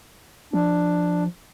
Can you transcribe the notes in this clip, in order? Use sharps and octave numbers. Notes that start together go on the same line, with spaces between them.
F3 D4